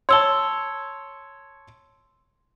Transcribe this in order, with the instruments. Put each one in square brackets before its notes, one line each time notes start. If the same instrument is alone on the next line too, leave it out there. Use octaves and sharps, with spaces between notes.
[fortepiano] C#5 A5 [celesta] C6 E6 G7